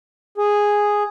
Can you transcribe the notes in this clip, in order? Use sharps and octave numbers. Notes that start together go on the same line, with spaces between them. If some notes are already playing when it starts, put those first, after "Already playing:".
G#4